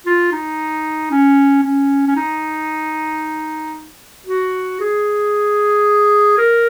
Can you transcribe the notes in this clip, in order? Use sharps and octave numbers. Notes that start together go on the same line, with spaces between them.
F4
D#4
C#4
C#4
C#4
D#4
F#4
G#4
A#4